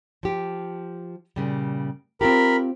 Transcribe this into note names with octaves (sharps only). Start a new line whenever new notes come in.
F3 G4
A#2 C#3 G3
C4 F4 G4 A#4 B5